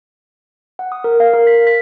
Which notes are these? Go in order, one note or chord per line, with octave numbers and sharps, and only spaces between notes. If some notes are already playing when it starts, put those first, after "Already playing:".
F#5
D#6
A#4
F5
A#4
B6
B6